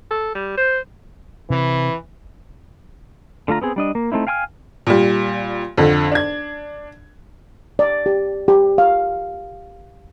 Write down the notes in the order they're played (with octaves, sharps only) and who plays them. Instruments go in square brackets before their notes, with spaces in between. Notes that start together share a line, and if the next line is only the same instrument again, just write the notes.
[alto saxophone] A4
G3
C5
[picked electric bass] C3 [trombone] E3
[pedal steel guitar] D3 A3 F4 A#5
B3 C4 G#4
G3 D4 D#5
A#3
A3 C4 D#4 E4
F5 G5 G#5 C6 F6
[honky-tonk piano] A#2 G3
F2 D3
D4 G#6
[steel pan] D5
G4
G4
F5